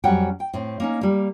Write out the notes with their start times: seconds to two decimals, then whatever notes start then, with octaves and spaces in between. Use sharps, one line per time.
0.04 F2 F#3 G3 C#4 F#5 G5
0.40 G5
0.54 A2 C4
0.80 A#3 C#4 D#4
1.01 G3 A#3